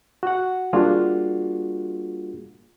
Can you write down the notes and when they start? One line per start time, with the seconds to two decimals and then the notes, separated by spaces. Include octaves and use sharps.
0.23 F#4 F#5
0.73 G3 A#3 D4 F4 F#4 G#4